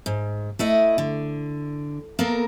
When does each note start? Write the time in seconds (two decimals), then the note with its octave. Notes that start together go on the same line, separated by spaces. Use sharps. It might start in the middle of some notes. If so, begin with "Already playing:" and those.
0.06 G#2
0.59 A3 E4 D#5
0.98 D3
2.19 A#3 B3 A4 A#4